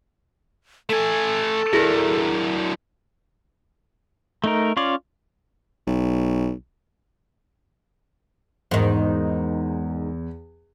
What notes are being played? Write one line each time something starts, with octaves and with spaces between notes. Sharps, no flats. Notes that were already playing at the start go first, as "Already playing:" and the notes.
A3 A4 G#5
F#3 D4 E4 G#4 A#4
A3 D#4 A#4
C#4 F4 C#5 D5
B1
E2 G#2 D#3